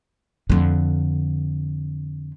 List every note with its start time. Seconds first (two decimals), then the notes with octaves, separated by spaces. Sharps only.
0.50 F2 D3